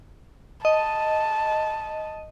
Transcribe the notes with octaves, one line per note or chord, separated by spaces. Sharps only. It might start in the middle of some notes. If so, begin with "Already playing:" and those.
D#5 A5